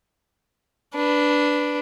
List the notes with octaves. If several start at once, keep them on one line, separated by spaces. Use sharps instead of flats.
D4 B4